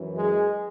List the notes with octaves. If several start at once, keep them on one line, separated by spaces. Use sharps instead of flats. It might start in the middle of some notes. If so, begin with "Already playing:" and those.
Already playing: F#2 E3
G#3